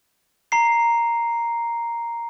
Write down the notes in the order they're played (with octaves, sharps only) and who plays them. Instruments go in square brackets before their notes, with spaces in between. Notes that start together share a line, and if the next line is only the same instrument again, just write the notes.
[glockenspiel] A#5 C7